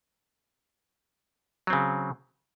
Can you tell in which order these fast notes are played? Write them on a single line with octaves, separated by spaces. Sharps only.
F#3 C4 C#3